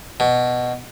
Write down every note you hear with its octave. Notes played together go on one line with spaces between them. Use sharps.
B2